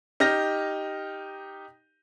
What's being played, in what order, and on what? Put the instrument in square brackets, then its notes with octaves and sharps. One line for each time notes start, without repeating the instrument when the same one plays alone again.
[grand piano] D#4 G4 F6 A#6